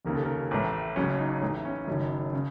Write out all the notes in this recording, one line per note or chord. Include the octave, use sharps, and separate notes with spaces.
F1 D#2 C#3 A#4
A4
A#4
A1 A2
F#1 F#2 C#3 C#4
D#4
A1 A2 D#4
C#4
F#1 F#2 D#3
C#3